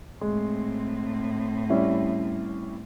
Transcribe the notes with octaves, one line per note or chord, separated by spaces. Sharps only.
A2 G#3 C4
G3 C#4 E4